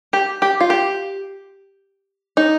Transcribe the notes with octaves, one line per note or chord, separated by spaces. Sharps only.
G4
G4
F4
G4
D#4